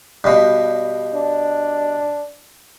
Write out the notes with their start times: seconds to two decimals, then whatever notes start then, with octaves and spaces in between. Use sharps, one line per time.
0.24 G2 B2
1.15 D4